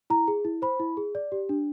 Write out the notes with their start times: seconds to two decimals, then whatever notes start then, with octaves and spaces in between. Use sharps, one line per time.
0.10 E4 A#5
0.28 G#4
0.45 E4
0.62 C5 B5
0.80 E4
0.97 G#4
1.15 D5
1.32 G4
1.49 D4